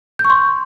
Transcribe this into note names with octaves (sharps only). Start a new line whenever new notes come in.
G6
C#6
C6